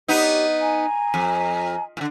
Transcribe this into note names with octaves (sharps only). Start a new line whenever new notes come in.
B3 D#4 G4 C#5
G#5 A#5
F2
A#2 D3